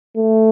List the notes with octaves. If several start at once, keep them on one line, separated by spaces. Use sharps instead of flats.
A3